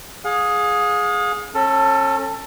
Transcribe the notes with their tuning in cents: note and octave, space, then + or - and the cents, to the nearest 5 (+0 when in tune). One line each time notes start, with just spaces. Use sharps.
G#4 +0 F5 +40
C#4 -30 A4 +15